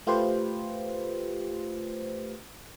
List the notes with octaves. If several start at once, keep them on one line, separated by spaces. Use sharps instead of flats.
A3 F4 G4 B4 C5